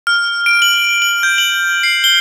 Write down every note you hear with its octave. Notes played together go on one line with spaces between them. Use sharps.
F6
D7
F#7
F#7
G6
F#7
C7
G7